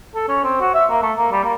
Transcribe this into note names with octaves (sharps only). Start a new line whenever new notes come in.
A4
C#4
C4
F#4
E5
A#3
A3
A#3
G3
A#3